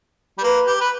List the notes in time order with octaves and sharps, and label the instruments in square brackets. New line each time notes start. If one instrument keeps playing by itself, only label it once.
[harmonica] G3
[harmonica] A#3 [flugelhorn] B4
[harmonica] G4
B4